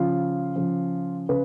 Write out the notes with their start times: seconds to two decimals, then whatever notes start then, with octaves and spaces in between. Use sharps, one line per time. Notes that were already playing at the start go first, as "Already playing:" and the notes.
Already playing: C#3 F3 F4
0.56 C#3 F3
1.29 C#3 B4